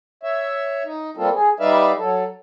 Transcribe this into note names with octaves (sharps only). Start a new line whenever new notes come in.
C#5 E5
D#4
G3 A#3 C4 F4 A4
G#4
G3 D#4 B4 D5 E5 F5
F#3 A4